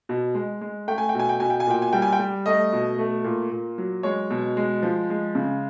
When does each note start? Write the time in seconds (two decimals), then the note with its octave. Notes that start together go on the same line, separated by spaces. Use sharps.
0.09 B2
0.34 G#3
0.61 G#3
0.88 A3 G5
0.98 G#5
1.09 G5
1.15 B2 G#5
1.29 G5
1.40 B2 G#5
1.50 G5
1.60 G#5
1.67 A#2 G5
1.82 G#5
1.93 G3 G5
2.02 G#5
2.13 G5
2.20 G3
2.46 A3 D#5
2.73 B2
2.98 A3
3.24 A#2
3.51 A#2
3.78 F#3
4.03 G#3 C#5
4.30 B2
4.57 G#3
4.83 F3
5.10 G#3
5.35 C#3